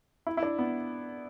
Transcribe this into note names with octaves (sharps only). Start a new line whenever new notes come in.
E4
E4
D4
B3